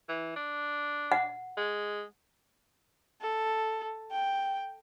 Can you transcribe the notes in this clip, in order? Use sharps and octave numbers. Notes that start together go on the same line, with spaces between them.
E3
D4
F#5
G#3
A4
G5